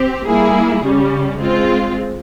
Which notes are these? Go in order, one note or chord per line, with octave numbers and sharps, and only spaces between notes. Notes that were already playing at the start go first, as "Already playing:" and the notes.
Already playing: C4 G4
G3 A#3 E4 G#4
C#3 G3 C#4
G#3 C4 F4